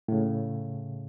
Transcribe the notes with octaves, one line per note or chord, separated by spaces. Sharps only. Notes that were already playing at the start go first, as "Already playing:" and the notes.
A2 C#3